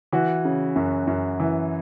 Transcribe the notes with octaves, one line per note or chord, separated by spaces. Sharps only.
E3 F#4
C#3
F#2
F#2
E3